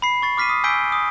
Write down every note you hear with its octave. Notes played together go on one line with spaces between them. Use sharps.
B5 C7
C#6 A6 C7
D6 F6 B6 C7 D#7
D#6
G#5 E6 G6 B6 D7 G7
D#6